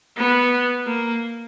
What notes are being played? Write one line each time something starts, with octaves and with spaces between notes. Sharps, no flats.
B3
A#3